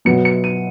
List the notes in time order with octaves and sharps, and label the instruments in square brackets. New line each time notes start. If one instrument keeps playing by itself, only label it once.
[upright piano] B2 F#3 B3 C#7
C#7
D#7